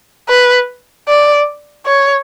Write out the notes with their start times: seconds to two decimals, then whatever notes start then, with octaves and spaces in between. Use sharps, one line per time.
0.29 B4
1.08 D5
1.86 C#5